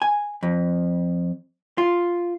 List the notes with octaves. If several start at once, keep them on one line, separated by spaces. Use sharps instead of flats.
G#5
F2
F4